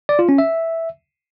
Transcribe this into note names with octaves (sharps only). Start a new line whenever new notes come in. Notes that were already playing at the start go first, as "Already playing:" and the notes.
D5
F4
C#4
E5